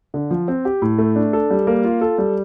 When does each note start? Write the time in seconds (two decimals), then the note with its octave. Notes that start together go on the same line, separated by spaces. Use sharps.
0.14 D3
0.31 F3
0.48 C4
0.65 G4
0.82 A2
0.98 A3
1.16 D4
1.33 A4
1.51 G3
1.67 A#3
1.84 F4
2.01 A4
2.18 G3